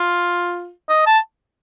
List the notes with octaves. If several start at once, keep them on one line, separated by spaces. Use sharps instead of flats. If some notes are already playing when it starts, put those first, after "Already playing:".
Already playing: F4
D#5
A5